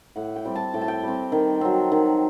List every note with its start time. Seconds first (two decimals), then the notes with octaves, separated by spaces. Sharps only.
0.16 A2 F#5
0.36 G5
0.45 G3 C4
0.55 A5
0.74 A2 G5
0.82 A5
0.88 G5
1.03 G3 C4
1.32 D#3
1.61 F#3 C4
1.92 D#3